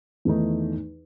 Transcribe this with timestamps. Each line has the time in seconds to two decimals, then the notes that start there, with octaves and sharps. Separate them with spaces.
0.25 E2 D#3 A3 D#4